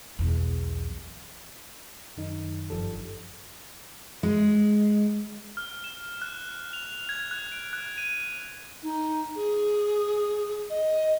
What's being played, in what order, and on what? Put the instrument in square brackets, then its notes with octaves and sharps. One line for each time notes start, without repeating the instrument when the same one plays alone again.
[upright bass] B1 E2
[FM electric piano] F#2 D#3 D#4
G1 G2 F3 G3 A4
[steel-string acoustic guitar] G#3
[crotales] F6
E7
F#6
F7
G#6
F#6
D7
F#6
D#7
[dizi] D#4
G#4
D#5